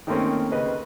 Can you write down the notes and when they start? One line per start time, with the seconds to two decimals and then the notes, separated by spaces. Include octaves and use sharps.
0.07 D#3 A3 A#3 C4 C#4
0.52 C#3 B4 D#5